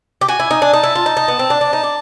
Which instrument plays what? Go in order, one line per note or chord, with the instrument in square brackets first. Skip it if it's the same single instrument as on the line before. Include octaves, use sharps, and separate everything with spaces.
[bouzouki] G4
[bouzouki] F#4 [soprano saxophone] G#5
[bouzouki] E4
D#4
D4
[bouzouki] D#4 [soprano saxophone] A5
[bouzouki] E4
F4
D#4
D#4
B3
C4
D4
D4
D#4
D4